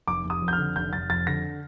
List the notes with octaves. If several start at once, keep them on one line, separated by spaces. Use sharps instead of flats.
F1 D6
F1
D#6
F2
G6
F6
D3
F1 G6
F1 A6
F2 A6
D3 A#6